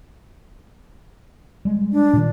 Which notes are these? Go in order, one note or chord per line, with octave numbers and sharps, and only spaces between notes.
G3 G#3
D4
A#2 D#3